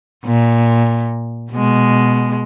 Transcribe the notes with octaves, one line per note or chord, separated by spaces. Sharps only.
A#2
B2 G#3